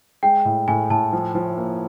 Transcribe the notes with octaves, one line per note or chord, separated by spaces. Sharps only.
G#3 G5
A2
A2 G#5
A2 A5
F3
F3
A#3